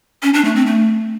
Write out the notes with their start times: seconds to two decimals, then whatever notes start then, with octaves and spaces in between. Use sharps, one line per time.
0.23 C#4
0.34 D4
0.45 A3
0.55 C4
0.66 A3